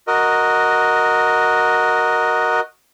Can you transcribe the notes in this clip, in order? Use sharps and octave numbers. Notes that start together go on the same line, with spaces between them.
F#4 A#4 D#5